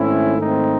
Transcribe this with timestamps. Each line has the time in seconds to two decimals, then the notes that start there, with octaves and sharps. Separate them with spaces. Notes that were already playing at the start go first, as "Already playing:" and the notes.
Already playing: G#2 D#3 A3 C4 C#4 E4
0.40 C4 D#4